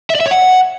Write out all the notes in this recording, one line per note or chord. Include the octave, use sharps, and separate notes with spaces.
E5
D5
E5
C#5
F#5